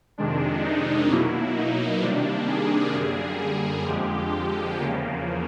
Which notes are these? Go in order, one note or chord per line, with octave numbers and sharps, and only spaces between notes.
F2 C3 D#3 G#3 D4
D#4
B2 F#3 A#3 E4
D#4
C3 D#3 G3 A#3 D4
G#4
F#2 D3 G3 A#3 G#4
G#4
F2 D3 F3 G#3 G4
E2 C#3 F3 A#3